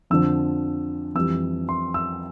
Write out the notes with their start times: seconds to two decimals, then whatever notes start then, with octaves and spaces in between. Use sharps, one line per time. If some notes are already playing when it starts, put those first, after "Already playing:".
0.10 F2 D3 F3 E6
1.15 F2 E3 G3 E6
1.69 C6
1.94 E6